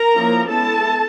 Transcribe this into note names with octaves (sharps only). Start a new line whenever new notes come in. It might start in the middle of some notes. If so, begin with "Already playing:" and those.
Already playing: A#4 A#5
F3 A#3 C#4 E4
G#3 B3 E4 A4 A5